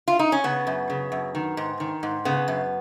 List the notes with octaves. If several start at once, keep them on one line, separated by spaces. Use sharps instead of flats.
F4
D#4
C#4
C#3 B3
F#2
C#3
F#2
D#3
G#2
D#3
G#2
C#3 B3
F#2